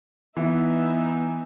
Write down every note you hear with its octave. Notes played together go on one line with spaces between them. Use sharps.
E3 B3 D#4 E5